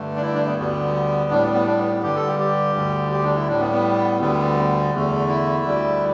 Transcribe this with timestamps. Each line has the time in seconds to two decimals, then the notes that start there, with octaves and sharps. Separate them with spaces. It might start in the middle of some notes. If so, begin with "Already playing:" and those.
Already playing: G2 D3 A3
0.16 D4
0.22 E4
0.34 D4
0.46 B3
0.57 D2 D3 G3 B3
1.31 A2 G3 D4
1.42 B3
1.54 B3
1.67 D4
1.79 B3
2.03 G2 D3 G3 G4
2.15 A4
2.27 G4
2.39 G4
2.75 D2 D3 G3
3.12 G4
3.24 D4
3.36 E4
3.48 A2 G3 D4
3.60 B3
3.72 B3
4.20 D2 D3 G3 B3
4.92 E2 D3 A3
5.29 E4
5.65 D2 D3 G3